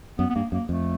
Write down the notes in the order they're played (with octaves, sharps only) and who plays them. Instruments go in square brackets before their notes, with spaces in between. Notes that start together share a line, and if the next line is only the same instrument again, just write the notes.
[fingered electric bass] F#2 [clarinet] B3
[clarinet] B3
[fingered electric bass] G2 [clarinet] A#3
[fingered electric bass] F#2 [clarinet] A#3
[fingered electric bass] F2 [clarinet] A3